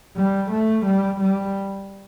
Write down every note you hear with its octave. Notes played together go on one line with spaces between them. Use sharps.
G3
A3
G3
G3